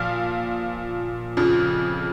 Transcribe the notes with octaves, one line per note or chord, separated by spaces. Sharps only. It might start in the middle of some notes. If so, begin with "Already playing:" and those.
Already playing: A#2 F3 F5
F2 C#3 F3